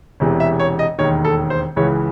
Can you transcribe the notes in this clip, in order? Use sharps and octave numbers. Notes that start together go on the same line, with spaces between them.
E1 E2 C3 E3
E5
C#5
D#5
E1 D#2 D#3 C#5
A4
C5
C#2 C#3 E3 C#5